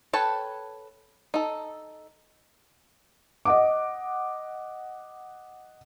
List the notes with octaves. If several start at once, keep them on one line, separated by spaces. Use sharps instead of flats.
A4 B4 C#5 G5 A5
D#4 A4
D#5 F#5 D6